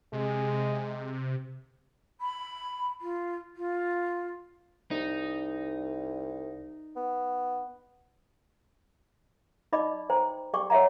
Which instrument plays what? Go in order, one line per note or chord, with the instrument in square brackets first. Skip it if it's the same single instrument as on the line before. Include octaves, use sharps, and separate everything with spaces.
[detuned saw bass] C3 [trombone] G#3
[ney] B5
F4
F4
[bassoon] C2 [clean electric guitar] D#4
[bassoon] B3
[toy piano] D#4 D5 D#5 B5 D6
C5 G5 A#5
G4 D5 G5 C#6 D6
C#5 D#5 E5 F#5 A#5